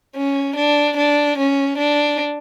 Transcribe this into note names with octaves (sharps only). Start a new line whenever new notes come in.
C#4
D4
D4
C#4
D4